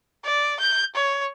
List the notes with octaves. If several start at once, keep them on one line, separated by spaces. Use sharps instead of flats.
D5
G6
C#5